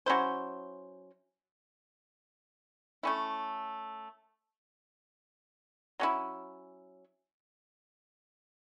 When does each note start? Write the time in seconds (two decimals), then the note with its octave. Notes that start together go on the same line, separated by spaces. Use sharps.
0.06 F#3 C#4 E4 C5
3.03 A3 C#4 E4
6.00 F#3 C#4 E4